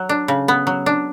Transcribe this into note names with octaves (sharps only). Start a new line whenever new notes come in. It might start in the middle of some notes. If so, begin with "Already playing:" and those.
Already playing: F#3
D4
C#3
B3
F#3
D4